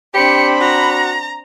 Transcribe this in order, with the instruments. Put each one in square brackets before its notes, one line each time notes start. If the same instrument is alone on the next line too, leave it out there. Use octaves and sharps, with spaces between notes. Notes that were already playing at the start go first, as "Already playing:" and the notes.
[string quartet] C4 D4 [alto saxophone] G4 [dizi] B5 [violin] C#7
[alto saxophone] F#4 [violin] A#5